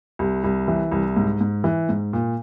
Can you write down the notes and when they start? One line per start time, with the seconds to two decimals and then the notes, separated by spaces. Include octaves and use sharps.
0.19 C2
0.44 C2
0.68 E3
0.92 C2
1.16 G#2
1.41 G#2
1.64 E3
1.89 G#2
2.13 A#2